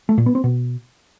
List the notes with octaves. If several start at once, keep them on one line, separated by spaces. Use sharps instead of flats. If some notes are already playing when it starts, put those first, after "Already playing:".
A3
A#2
B3
C4
B2